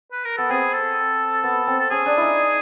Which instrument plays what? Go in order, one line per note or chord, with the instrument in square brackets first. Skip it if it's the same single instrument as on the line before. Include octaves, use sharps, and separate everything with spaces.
[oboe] B4
A#4
[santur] B3 [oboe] A4
[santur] C4 [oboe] G#4
[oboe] A4
[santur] B3
C4
[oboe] A4
[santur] C#4 [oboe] G#4
[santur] D4
D#4 E4